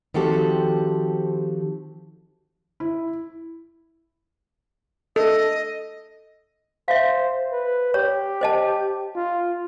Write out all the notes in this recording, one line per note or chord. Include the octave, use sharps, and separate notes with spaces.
D#3 F3 C4 F#4 G4 A4
E4
A4 D#5
C5 E5 F5
B4
G4 C#5
C5 D#5 A5
F4